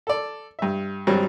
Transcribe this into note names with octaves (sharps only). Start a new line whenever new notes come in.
A4 D5
G2 E5
G#1 G2 F#3 G3 C4